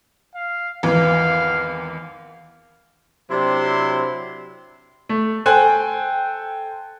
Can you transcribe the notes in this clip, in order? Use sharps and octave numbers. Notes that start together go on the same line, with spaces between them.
F5
G#1 E2 E3 F5
C3 F#3 C4 D4 E4 C6
A3
A4 C5 G5 G#5 F#6